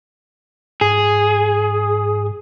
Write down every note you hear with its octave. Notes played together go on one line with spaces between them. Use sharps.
G#2 G#4